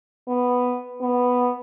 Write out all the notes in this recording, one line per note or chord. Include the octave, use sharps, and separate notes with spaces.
B3
B3